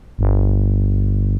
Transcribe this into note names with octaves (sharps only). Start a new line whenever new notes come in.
G1